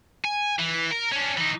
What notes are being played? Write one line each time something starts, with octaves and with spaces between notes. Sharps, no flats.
G#5
E3
A#4
C#4 D4
E3 D#4